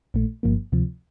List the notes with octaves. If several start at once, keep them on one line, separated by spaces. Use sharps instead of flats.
A#1 A#2 A3
G1 G2 F3 A#3
D2 C3 F3